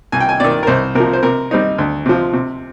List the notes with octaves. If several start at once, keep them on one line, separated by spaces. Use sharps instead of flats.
C2 G#5
G5
G#5
C3 D#3 D5
A#4
C2 C5
C3 F3 A#4
C5
C3 A#4
G3 C4 D#4
D2
C3 F3
C3